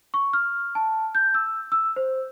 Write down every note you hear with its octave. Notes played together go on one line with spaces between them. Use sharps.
C#6
F6
A5
G6
E6
E6
C5